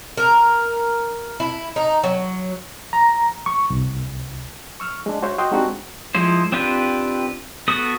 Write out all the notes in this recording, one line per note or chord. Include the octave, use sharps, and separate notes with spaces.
A#4
E4
D#4
F#3
A#5
C#6
C2
C#6 E6 F6
G#3 D4
F#4 C5 C#5 E5
F#4 D#5 G5 C6 D#6 E6
G#3 C4 D4 D#4 F#4 G4
F3 G#3 E4 C5
C4 D4 F4 G4 B4
B3 F#4 A4 D#6